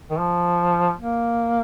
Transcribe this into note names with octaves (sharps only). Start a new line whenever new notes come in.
D#3
F3
A#3